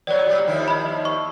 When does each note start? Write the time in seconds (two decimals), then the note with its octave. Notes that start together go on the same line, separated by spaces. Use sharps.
0.07 F#3 B3 C#5 D5
0.25 A#2 G3
0.47 D#2 F3 E4
0.68 D#5 B5
1.05 C#6